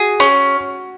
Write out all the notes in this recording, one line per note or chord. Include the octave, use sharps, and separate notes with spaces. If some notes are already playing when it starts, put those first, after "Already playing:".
Already playing: F#4 G#4
C#4